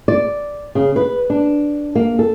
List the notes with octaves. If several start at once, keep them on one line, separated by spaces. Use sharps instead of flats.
D5
C#3
B4
D4
A#3
A4